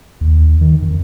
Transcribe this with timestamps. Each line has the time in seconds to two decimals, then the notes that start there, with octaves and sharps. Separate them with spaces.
0.21 D#2
0.61 D#3
0.82 F2